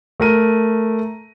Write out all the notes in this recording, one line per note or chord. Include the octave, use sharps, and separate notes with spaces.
A3 A#4 D#7